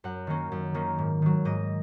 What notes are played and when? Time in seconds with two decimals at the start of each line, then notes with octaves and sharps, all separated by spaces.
0.04 F#2 F#5
0.27 D#3 A#3 C#4
0.52 F#2
0.75 D#3 A#3 C#4
0.98 G#2
1.22 D#3 F#3
1.45 G#2 D#5